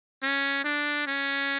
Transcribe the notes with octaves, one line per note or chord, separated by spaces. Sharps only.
C#4
D4
C#4